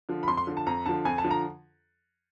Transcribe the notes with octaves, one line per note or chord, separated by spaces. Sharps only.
D3 F3
B5
F2 C6
C6
D3 F3
A5
F2 A#5
D3 F3 A5
F2 G#5
A5
D3 F3
A#5